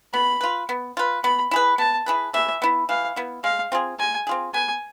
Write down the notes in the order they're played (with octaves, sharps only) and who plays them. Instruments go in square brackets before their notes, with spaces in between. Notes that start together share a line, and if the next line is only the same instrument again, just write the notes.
[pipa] B3 [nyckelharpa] B5
[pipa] F4 B4
B3
F4 B4
[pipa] B3 [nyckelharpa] B5
[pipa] E4 G#4 B4
[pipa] B3 [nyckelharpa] A5
[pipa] E4 G#4 B4
[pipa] E3 [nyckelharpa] E5
[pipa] B3 E4
[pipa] E3 [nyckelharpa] F5
[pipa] B3 E4
[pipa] G#3 [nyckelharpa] F5
[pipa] C4 F4 G#4
[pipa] G#3 [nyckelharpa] G#5
[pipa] C4 F4 G#4
[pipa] B3 [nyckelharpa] G#5